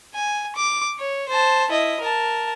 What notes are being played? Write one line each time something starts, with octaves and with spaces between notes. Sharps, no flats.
G#5
D6
C#5
C5 A5
E4 D#5
A#4 A5